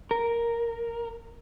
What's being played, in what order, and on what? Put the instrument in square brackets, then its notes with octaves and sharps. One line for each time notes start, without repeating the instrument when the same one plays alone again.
[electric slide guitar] A#4